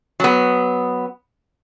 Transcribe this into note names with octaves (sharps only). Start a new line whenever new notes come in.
F#3 B3